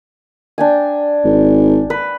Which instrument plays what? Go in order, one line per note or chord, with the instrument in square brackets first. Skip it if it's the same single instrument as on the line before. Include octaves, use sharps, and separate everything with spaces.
[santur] D4 G5 G#5
[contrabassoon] G#1
[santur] B4